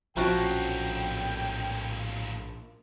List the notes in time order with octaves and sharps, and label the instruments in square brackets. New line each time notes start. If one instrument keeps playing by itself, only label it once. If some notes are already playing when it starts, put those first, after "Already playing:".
[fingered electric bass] A#1 D3 C#4 [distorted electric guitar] A2 A#3 [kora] F3 F#4 [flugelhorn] G5